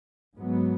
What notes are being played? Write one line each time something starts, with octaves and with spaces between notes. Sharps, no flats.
G#2 F#3 B3